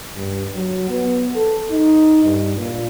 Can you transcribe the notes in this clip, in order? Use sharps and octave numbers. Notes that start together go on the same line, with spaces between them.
G2
F#3
B3
A4
D#4
G2
A#2